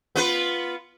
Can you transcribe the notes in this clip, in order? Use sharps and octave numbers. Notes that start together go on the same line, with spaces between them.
B3 F4 B4